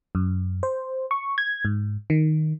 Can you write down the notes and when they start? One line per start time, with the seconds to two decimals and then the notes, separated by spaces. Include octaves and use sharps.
0.15 F#2
0.63 C5
1.11 C#6
1.38 G#6
1.65 G#2
2.10 D#3